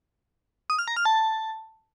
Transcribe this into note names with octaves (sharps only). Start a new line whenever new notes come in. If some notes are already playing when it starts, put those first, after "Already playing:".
D#6
F6
A#5
F6
A5